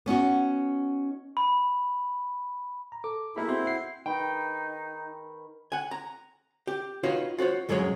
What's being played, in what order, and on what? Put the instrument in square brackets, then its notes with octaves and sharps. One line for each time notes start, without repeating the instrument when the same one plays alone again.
[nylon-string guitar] B3 C#4 D#4 F#4
[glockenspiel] B5
[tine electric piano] A#5
[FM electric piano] A4 [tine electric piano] D6
[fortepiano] A#3 D#4 B5 [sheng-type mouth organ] E4 [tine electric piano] G#4 A4 E5
[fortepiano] C4 [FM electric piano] F#4 C6 G6
[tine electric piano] E5 F#5 C7
[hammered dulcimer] D#3 B4 [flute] D#4 [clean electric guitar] G5
[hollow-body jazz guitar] F#5 G#5
A#5
G4
D#4 F4 F#4 B4 C#5 F5
F4 F#4 C5 C#5
C2 F#2 F#3 G#3 G#4 C#5